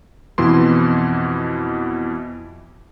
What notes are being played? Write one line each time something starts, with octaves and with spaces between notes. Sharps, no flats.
F2 B2 E3 E4 C6